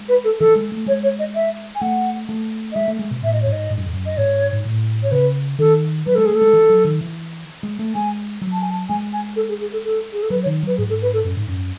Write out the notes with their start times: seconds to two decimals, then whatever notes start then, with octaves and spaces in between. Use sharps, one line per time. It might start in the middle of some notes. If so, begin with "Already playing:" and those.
Already playing: G#3
0.08 B4
0.24 A4
0.39 E3 A4
0.56 G#3
0.72 A3
0.86 G#3 C#5
1.03 C#5
1.19 D#5
1.35 E5
1.75 G#5
1.81 A3 F#5
2.29 A3
2.72 D#5
2.75 G#3 E5
2.88 A3
2.99 G#3
3.11 B2
3.24 A2 E5
3.33 D#5
3.42 C#5
3.47 G#2
3.52 D#5
3.70 G#2
3.78 F#2
3.86 E2
3.93 F#2
4.06 D#5
4.17 G#2 C#5
4.53 G#2
4.65 A2
5.03 C#5
5.11 C#3 B4
5.59 D#3 A4
6.06 F#3 B4
6.15 G#3 A4
6.25 G#4
6.30 A3 A4
6.42 G#3
6.53 E3
6.70 F#3
6.85 D#3
7.01 E3
7.63 G#3
7.79 A3
7.95 G#3 G#5
8.42 F#3
8.52 A5
8.61 G#5
8.70 A5
8.89 G#3 G#5
9.13 G#5
9.36 A4
9.49 G#4
9.61 G#4
9.72 A4
9.84 A4
10.12 G#4
10.22 A4
10.30 F#3 B4
10.43 C#5
10.46 D#3
10.63 F#3 B4
10.77 G#2 G#4
10.89 A4
11.02 B4
11.13 A4
11.25 F#2
11.37 G#2
11.48 F#2